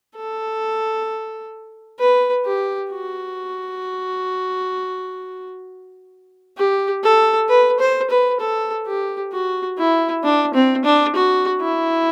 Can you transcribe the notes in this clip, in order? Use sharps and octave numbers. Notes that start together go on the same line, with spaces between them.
A4
B4
G4
F#4
G4
A4
B4
C5
B4
A4
G4
F#4
E4
D4
C4
D4
F#4
E4